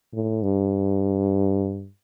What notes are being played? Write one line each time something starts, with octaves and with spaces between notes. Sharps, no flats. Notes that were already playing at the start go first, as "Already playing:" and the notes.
A2
G2